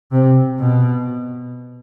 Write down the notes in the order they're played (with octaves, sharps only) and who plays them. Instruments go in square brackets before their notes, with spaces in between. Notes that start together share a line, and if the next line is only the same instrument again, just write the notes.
[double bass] C3
B2